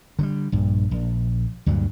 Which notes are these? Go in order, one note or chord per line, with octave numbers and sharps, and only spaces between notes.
D3 F#3 G3
A#1 G2
A#1
D2 G2 A#2 F#3